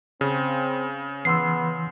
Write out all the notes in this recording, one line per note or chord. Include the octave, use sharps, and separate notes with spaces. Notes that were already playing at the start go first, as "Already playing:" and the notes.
C#3 C4
E3 B3 C6 E6 C7